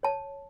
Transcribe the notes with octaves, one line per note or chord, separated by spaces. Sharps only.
C#5 A5